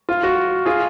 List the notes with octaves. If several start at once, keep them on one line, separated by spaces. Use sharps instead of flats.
F4
F#4
F4 G#4